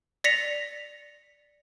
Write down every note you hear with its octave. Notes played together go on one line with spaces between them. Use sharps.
D5 A#6 B6 C#7 F7